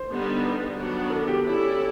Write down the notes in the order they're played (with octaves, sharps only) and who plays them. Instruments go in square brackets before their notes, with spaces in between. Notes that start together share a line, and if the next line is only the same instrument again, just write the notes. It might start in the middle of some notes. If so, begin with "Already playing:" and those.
Already playing: [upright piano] C5
[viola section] D3 G3 B3 D#4
[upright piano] B4
[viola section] D#3 F#3 B3 D4 F#4
[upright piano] A4
G4
[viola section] C#4 E4 A4 D5